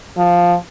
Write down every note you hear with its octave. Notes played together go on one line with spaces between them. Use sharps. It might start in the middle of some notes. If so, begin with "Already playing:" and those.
F3